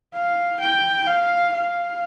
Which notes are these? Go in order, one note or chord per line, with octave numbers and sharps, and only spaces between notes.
F5
G5
F5
F5